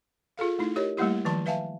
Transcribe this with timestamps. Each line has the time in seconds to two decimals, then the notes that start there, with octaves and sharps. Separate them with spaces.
0.37 F4 G#4 A4 F5
0.59 A3 D#4 E4
0.76 G4 A#4 C#5 D#5
0.97 G3 A3 A#3 E4 G4
1.25 D#3 F3 F#3 A5 C6
1.46 B4 E5 F5 G#5 A5